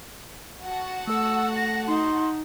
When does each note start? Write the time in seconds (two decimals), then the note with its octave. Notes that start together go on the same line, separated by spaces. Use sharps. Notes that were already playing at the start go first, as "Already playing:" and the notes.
0.63 F#4 F#5 A5
1.07 A3 A4 E6
1.56 A#6
1.87 D#4 C6